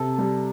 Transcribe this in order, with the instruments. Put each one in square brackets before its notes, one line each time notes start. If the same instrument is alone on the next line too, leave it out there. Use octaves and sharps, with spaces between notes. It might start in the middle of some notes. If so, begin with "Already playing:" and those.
Already playing: [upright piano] C3 [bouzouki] A4
[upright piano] G3